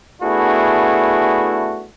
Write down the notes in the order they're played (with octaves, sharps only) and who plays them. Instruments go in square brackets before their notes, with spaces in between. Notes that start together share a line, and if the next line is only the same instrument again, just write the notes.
[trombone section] A3 B3 D4 E4 F#4 G#4